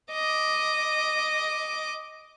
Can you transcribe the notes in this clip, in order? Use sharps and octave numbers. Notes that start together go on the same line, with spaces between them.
D#5 D6